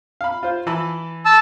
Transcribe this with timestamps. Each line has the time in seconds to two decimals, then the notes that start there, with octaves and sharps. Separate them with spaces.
0.21 F5 B5
0.43 F4 C5
0.67 E3 A5 B5
1.25 A5 E6